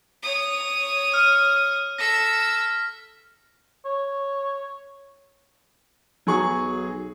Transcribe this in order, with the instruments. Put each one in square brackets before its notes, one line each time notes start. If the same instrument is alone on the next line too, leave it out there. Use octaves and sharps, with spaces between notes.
[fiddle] C#5 D#6
[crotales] F6
[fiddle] A4 E6 [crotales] A#6 B6
[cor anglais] C#5
[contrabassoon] B1 [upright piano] F#3 G#4 C#6